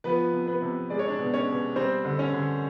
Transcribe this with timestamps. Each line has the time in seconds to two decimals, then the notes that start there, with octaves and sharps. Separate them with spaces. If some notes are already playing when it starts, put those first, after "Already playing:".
0.04 F3 B3 B4
0.33 C3
0.47 B3 B4
0.62 C3
0.90 G#3 D5
0.99 C#5
1.08 D4 D5
1.19 B2
1.34 C#4 C#5
1.48 B2
1.76 G3 C4 C5
2.05 D3
2.19 C#4 C#5
2.34 D3